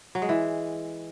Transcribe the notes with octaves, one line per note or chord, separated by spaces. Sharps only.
F#3
G#3
E3